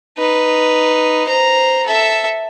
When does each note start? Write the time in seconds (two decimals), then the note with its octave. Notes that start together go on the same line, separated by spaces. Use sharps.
0.17 D#4 B4
1.27 C5 A#5
1.86 A4 E5